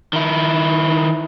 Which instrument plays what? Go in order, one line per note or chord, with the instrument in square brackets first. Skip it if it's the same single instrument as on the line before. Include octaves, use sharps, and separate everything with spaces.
[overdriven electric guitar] D#3 E4